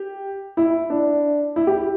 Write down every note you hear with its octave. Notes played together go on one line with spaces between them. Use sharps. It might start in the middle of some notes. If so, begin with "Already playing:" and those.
Already playing: G4
E4
D4
E4
G4